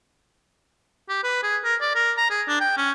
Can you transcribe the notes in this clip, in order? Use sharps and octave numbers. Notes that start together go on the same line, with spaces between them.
G4
B4
G#4
A#4
D5
A#4
A#5
G#4
D4
G5
C#4